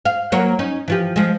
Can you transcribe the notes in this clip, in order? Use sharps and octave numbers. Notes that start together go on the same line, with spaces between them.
F5
F#3 A#3 C#5
C#4 D#4
E3 F3 G4
F3 G#3